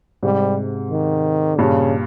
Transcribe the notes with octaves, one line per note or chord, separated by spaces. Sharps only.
G#2 C3 G3
D#3
G2 A#2 C#3